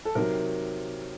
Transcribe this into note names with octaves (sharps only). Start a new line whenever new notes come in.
A4
C3 D#3 F#3 A#4